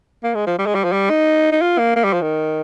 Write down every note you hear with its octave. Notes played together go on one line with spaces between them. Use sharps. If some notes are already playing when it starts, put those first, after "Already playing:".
A#3
G#3
F3
G3
G#3
G3
F3
G3
D#4
D#4
F4
A#3
A#3
G3
F3
D#3